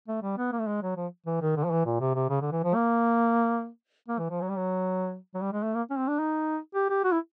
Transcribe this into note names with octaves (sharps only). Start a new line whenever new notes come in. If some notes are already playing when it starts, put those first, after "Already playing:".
A3
G3
B3
A#3
A3
G#3
F#3
F3
E3
D#3
D3
F3
E3
A#2
C3
C3
C#3
D3
E3
F3
A#3
A#3
E3
F3
F#3
G3
F#3
F#3
G3
G#3
A3
A#3
C#4
C4
D4
D#4
G4
G4
F#4
E4